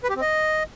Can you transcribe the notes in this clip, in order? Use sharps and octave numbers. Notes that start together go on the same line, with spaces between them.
B4
G4
C4
D#5